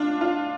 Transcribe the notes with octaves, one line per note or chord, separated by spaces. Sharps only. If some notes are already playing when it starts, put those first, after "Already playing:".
Already playing: D4 F4
F4